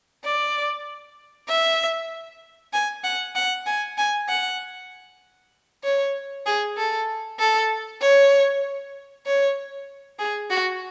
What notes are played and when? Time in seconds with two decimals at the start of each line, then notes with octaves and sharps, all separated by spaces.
0.24 D5
1.48 E5
2.73 G#5
3.04 F#5
3.35 F#5
3.66 G#5
3.98 G#5
4.29 F#5
5.84 C#5
6.46 G#4
6.77 A4
7.39 A4
8.01 C#5
9.26 C#5
10.19 G#4
10.50 F#4